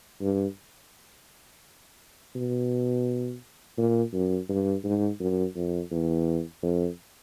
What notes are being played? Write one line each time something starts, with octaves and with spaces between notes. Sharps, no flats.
G2
B2
A#2
F#2
G2
G#2
F#2
F2
E2
F2